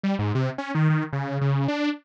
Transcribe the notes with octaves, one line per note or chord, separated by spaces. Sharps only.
G3
G#2
C3
C#4
D#3
D#3
C#3
C#3
D4